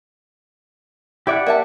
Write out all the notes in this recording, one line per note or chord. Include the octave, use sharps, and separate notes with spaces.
E4 G4 D5 E5 F#5
A#3 E5 A5